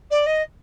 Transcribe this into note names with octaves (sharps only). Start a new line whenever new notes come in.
D5
D#5